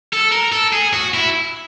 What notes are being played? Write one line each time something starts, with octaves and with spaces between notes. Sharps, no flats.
A4
A#4
A4
G#4
F#4
E4